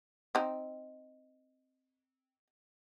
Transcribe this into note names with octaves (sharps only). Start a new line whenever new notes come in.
C4 D#4